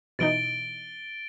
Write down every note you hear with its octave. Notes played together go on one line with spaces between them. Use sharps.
B2 E3 D#4 A6 D7 G7